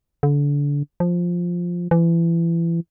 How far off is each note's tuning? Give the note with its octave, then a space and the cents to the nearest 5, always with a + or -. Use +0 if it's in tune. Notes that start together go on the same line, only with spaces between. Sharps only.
D3 -30
F3 +5
E3 +30